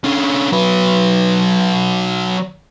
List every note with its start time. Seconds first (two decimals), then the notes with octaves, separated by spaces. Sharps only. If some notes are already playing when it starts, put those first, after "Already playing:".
0.04 D3 C#4
0.52 F#3 B4